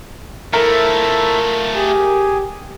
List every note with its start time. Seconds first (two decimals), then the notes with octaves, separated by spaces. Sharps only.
0.53 F3 A3 E4 A4 A#4 E5
1.75 G4 G#4 G#5